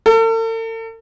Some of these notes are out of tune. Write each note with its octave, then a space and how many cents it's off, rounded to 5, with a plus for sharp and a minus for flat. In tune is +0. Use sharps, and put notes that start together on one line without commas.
A4 +45